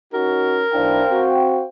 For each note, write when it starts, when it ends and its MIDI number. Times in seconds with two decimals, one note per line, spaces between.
0.14 0.64 61
0.14 0.64 63
0.14 0.64 66
0.14 1.28 70
0.74 1.04 35
0.74 1.04 62
0.74 1.04 64
0.74 1.65 72
0.74 1.65 77
0.74 1.65 79
1.10 1.65 60
1.10 1.65 66